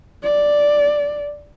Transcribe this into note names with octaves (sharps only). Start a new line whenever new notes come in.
D5